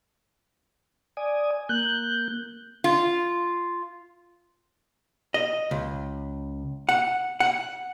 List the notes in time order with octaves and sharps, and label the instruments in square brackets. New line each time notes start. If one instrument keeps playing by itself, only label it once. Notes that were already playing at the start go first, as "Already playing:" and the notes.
[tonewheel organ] D5 G#5 D#6
[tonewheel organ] A#3 G6 [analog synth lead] F#6
[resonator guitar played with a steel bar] F4
[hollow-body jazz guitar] D#5
C#2
F#5
F#5